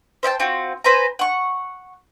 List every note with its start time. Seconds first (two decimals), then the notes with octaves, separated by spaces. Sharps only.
0.23 C5 E5 G5 A5
0.40 C4 F4 F#4
0.84 B4 C5 G#5 A#5
1.19 F#5 C#6